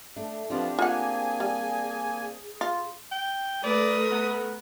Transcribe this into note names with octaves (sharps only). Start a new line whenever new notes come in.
A3 D4
F3 B3 C4 D4 F4 G4
A#3 F4 G#4 F#5 G#5
G3
F4
G5
A3 A#4 B4 D5 D#6
B3